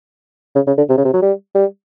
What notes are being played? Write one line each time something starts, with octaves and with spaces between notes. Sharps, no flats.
C#3
C#3
D3
C3
C#3
C3
F#3
G3
G3